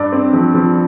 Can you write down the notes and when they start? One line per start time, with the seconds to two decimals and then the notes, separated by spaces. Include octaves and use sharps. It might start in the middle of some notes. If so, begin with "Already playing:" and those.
Already playing: G2 D5
0.12 C4
0.33 F3
0.54 F3